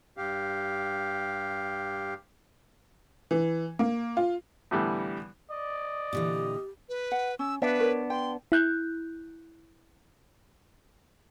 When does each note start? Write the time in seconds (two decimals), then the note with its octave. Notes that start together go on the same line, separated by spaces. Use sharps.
0.17 G2 G4 F5
3.31 E3
3.79 A#3
4.17 F4
4.71 A2 D3 E3 G3 B3
5.51 D5 D#5
6.13 A#2 D3 E3 G4
6.89 B4
7.12 F#5
7.39 C#4 E6
7.62 B3 D4 B4 E5 F5
7.80 A#4 C#5
8.10 G5 C6
8.52 E4 F#6 G6